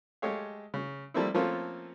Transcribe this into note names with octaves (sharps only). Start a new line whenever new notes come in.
G#3 A3 G4 C#5 F5
C#3
F3 G3 A3 A#3 C4 E4
F3 A3 A#3 C4 C#4 F4